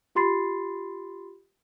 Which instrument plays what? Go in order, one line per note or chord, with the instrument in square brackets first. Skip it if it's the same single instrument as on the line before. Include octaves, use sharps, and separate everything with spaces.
[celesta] F4 G4 B5 C6 A6 C7